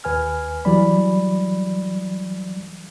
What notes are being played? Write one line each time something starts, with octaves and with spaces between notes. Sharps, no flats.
D#2 B4 G#5 F6
E3 F#3 G3 D5 B5